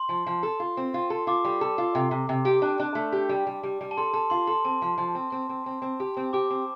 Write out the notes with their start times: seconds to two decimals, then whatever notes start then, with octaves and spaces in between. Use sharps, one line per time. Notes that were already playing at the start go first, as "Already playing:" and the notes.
Already playing: C6
0.09 F3
0.27 F3
0.43 A4
0.60 F4
0.77 C4
0.94 F4
1.10 A4
1.27 F4 D6
1.45 G3
1.61 A4
1.78 F4
1.95 C3
2.11 C3
2.29 C3
2.45 G4
2.62 D4 A5
2.80 D4
2.95 A3
3.12 G4
3.29 G3
3.47 G3
3.63 G3
3.81 G3
3.91 A5
3.97 A4 C6
4.13 A4 A5
4.30 F4 C6
4.47 A4 C6
4.65 C4 A5
4.82 F3
4.98 F3
5.15 C4
5.32 C4
5.49 C4
5.66 C4
5.82 C4
6.00 G4
6.17 C4
6.33 G4 D6
6.50 C4